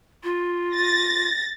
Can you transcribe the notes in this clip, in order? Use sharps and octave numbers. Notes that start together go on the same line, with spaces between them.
F4
A6 A#6